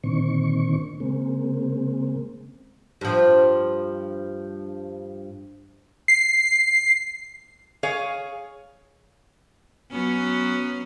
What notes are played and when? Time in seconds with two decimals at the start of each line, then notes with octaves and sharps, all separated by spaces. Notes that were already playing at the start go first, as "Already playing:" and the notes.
0.04 A#2 D3 D#3 C4 C#6
1.00 C#3 G#3 A#3 C4
3.01 G2 F3
6.08 C7
7.83 G#4 C#5 F5
9.91 F#3 B3 C#4